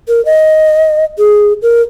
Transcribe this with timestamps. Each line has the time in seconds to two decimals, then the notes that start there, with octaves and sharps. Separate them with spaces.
0.08 A#4
0.25 D#5
1.18 G#4
1.62 A#4